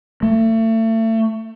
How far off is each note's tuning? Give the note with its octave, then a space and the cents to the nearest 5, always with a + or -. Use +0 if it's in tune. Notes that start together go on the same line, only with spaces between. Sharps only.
A3 +30